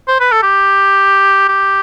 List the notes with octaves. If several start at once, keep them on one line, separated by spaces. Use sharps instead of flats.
C5
B4
A4
G4
G4